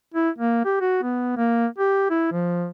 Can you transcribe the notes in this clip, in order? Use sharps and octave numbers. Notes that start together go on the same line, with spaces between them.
E4
A#3
G4
F#4
B3
A#3
G4
E4
F3